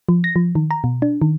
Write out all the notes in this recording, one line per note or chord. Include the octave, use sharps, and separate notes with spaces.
F3
A#6
F3
D#3
A#5
B2
D4
D#3